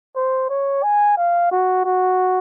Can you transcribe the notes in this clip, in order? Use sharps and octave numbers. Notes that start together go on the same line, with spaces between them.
C5
C#5
G#5
F5
F#4
F#4